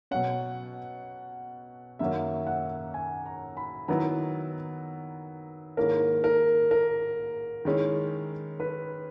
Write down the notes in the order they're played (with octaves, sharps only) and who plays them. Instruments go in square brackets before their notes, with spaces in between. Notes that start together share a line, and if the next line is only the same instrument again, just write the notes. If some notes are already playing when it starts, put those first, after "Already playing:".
[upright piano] B2 F#3 C#4 [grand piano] F#5
[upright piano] F#2 D#3 F#3 A#3 C#4 [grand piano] E5
[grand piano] F#5
G#5
A#5
B5
[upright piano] D#3 F#3 B3 E4 [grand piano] A#5
[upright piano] G#2 D#3 A#3 C#4 E4 [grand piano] A#4
[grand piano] A#4
A#4
[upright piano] D#3 G#3 C#4 E4
[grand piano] B4